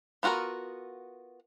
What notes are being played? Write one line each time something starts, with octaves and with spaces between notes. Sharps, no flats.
B3 F4 F#4 A4 A#4